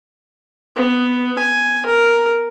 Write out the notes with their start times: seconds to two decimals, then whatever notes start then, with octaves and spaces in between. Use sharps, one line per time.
0.76 B3
1.38 G#5
1.86 A#4